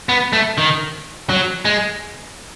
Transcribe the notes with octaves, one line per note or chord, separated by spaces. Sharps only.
B3
A3
D#3
F#3
G#3